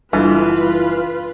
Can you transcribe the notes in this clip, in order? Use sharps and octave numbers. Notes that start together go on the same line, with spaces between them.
F#1 E3 G3 D4 F4 A4 B4